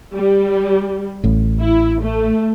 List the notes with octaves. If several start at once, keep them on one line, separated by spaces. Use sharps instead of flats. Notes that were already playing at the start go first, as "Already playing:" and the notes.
G3
A1 A2
E4
A3